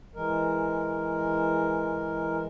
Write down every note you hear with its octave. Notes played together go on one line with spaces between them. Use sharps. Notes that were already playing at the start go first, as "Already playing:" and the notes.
E3 G#3 A#4